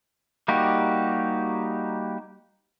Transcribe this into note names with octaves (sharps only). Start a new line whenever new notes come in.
G3 A#3 D#4 F#4 G4